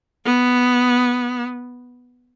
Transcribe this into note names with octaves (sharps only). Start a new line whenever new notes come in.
B3